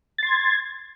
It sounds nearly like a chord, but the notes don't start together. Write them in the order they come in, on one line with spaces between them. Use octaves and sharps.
A6 C6 G#6